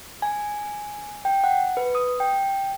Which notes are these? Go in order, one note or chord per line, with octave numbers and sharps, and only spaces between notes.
G#5
G5
F#5
B4
D#6
G5